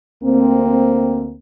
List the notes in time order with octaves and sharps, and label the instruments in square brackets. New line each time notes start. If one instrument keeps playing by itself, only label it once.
[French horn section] D2 A#3 C4